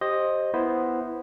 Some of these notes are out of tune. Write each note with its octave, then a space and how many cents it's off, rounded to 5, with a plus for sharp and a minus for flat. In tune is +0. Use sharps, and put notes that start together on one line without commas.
G4 +0 C5 +15 D#5 +0
B3 +0 E4 +0 C5 -5